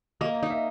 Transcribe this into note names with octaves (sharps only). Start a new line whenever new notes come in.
A#3 D#5
D#4
E5